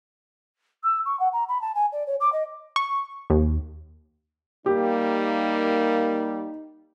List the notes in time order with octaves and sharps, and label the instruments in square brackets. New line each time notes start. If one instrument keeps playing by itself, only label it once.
[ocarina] E6
C#6
F#5
A#5
B5
A5
G#5
D5
C#5
D6
D#5
[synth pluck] C#6
D#2
[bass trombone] G3 [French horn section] A#3 [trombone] D#4 [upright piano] G4